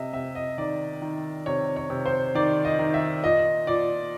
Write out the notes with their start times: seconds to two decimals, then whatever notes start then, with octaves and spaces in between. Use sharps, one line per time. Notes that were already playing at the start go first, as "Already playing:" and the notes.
Already playing: C3 D#5 E5
0.13 C3 E5
0.35 D#5
0.58 D#3 D5
1.02 D#3
1.46 C3 C#5
1.76 C#5
1.90 C3
2.06 C5
2.35 D#3 D5
2.65 D#5
2.79 D#3
2.94 E5
3.23 A#2 D#5
3.67 A#2 D5